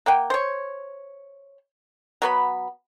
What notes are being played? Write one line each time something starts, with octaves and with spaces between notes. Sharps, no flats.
A#3 F#5 G5
C5 C#5
F#3 B3 B5